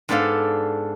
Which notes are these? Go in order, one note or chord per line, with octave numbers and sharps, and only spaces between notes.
G#2 B3 D4 A4 F5